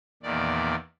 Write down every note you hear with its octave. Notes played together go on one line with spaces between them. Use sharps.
E2 A#2 D#3 D5